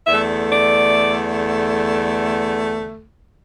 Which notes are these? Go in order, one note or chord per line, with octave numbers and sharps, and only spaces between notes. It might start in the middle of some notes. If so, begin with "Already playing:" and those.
E2 D3 A3 E5
D5